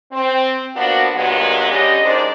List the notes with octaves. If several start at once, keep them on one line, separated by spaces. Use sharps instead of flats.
C4
F3 A#3 B3 D4 F#4
G2 A#2 F#3 G#3 A#3 B3
D3 G3 C#4 G4 D#5
F#2 G#3 D4 D#4 C5 D5